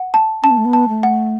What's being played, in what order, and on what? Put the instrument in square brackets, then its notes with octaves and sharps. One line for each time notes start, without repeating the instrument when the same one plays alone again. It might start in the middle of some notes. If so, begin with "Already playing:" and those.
Already playing: [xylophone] F#5
A5
[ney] C#4 [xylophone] A5
[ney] B3
A3
B3
[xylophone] A5
[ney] A3
[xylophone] F#5